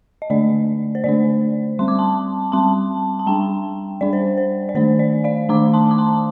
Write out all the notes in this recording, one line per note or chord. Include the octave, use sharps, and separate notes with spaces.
D#5
D3 A3 D4 D5
C5
D3 A3 D4 D5
G3 C4 C6
D6
A5 C6
G3 C4 A5 C6
A5
G3 D4 G5 A#5
G3 D4 D5
C5
C5
D5
D#3 A3 D4 C5
D5
D5 F5
D#3 A3 D4 A#5 D6
A5 C6
D6
A5 C6